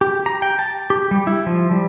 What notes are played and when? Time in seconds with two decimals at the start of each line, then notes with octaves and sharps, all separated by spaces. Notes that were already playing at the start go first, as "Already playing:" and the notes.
0.01 G4
0.26 A#5
0.42 G5
0.59 A5
0.90 G4
1.11 G3
1.27 E4
1.47 F3
1.71 G3